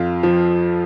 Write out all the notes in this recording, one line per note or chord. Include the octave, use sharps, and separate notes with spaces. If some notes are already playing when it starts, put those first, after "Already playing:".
Already playing: F2 F4
F3